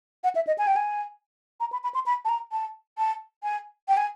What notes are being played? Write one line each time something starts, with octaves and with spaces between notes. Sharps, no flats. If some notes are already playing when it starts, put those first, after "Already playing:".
F#5
E5
D#5
G#5
G5
G#5
A#5
B5
B5
C6
B5
A5
A#5
A5
A5
G#5
G5
G#5